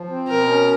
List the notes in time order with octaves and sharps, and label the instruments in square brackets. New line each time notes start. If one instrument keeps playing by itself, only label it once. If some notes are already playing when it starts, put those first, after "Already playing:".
Already playing: [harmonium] F3
C4
[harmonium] B2 [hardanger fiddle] A#4
[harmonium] C#4